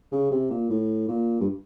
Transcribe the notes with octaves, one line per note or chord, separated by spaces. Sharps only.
C#3
C3
A#2
A2
A#2
G2